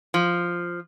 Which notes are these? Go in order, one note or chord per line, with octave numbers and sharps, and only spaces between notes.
F3